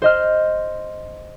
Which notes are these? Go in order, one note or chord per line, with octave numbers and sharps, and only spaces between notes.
C5 D#5 F6